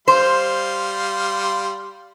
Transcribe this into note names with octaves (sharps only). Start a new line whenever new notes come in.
G3 C5 F5 C6